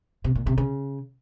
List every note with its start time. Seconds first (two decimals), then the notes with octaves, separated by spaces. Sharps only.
0.24 C3
0.35 A#2
0.47 C3
0.58 C#3